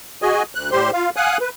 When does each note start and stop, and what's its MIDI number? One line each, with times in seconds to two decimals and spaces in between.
0.22 0.43 66
0.22 0.43 68
0.22 0.43 75
0.22 0.43 80
0.55 0.70 38
0.55 0.70 90
0.72 0.91 45
0.72 0.91 55
0.72 0.91 67
0.72 0.91 72
0.72 0.91 84
0.93 1.10 65
0.93 1.10 77
1.16 1.38 77
1.16 1.38 78
1.16 1.38 80
1.16 1.38 87
1.16 1.38 90
1.41 1.49 71